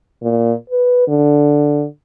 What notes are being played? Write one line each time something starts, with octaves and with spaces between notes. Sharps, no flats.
A#2
B4
D3